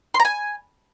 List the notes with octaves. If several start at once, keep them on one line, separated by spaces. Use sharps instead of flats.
C6
A#5
G#5